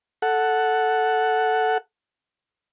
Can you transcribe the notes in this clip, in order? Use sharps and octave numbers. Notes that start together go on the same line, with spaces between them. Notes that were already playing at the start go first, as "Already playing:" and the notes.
A4 F#5